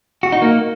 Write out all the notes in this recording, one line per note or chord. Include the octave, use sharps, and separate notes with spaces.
F#4
D#4
A#3